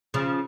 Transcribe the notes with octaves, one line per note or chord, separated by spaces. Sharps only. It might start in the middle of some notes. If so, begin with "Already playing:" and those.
C#3 F3